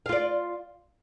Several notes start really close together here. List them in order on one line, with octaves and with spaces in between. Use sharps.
F5 F4 D5